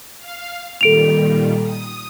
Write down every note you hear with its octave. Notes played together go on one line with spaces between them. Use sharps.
F5
A#2 D#3 G3 A4 D7 F7
D#6